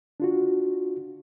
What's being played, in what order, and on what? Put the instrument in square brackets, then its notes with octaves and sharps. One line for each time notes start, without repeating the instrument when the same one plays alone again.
[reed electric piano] D4 F4 F#4